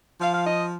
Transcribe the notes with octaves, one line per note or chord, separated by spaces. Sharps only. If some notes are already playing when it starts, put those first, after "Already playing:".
F3 F5
F5
D#5